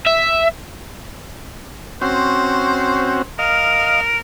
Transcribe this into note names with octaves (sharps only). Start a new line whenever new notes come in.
E5
C4 C#4 F#4 C5
A#4 D#5 F5